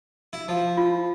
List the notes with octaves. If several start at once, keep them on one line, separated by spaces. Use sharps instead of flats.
E4
F3
F4